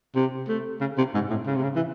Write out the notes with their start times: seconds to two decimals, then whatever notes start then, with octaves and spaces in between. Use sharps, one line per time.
0.15 C3
0.48 A3
0.81 C#3
0.98 C3
1.14 G#2
1.30 A2
1.47 C#3
1.56 C3
1.63 C#3
1.76 E3